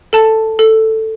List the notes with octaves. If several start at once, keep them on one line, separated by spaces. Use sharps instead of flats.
A4 A5
A4